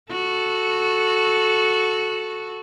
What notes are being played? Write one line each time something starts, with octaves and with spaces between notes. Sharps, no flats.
F#4 A4